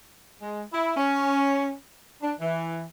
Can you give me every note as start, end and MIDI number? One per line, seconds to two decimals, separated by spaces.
0.42 0.63 56
0.73 0.94 64
0.97 1.73 61
2.22 2.34 62
2.41 2.82 52